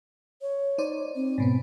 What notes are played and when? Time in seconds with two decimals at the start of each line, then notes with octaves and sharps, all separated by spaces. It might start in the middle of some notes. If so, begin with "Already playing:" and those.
0.42 C#5
0.78 D#4 C5 D5
1.16 C4
1.38 G#2 B2 B3